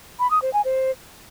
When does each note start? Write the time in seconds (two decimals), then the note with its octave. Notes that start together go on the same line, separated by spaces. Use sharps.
0.19 B5
0.31 D#6
0.42 C5
0.53 G#5
0.65 C5